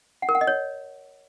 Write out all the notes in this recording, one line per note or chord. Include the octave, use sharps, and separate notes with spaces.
F#5
A#4
F#5
D#5
C#5